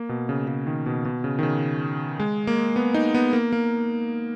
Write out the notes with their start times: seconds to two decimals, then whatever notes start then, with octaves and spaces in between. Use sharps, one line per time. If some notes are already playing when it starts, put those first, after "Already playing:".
Already playing: A#3
0.09 B2
0.29 C#3
0.48 C#3
0.67 D#3
0.86 B2
1.05 B2
1.24 C#3
1.39 D#3
1.43 C#3
2.20 G#3
2.47 A#3
2.76 B3
2.94 D#4
3.14 B3
3.33 A#3
3.53 A#3